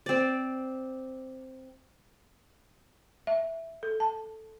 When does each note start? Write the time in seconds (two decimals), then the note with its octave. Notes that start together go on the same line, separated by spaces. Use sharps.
0.06 C4 D5
3.27 E5
3.83 A4
4.00 A5